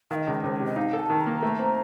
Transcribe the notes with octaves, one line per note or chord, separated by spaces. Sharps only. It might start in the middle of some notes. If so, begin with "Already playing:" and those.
D#3 D#5 F5
C#2
A#4
C#2 C5
C3 C#5
D#5
D#4 F5
A4
A5
D#3
A#5
A#3
A3
C4